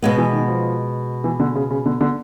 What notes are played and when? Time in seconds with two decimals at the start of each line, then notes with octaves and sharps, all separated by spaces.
0.02 B2 G#3 B3
0.18 E3
0.33 D#3
0.48 F3
1.24 E3
1.40 D3
1.55 C#3
1.70 C#3
1.86 D3
2.01 D3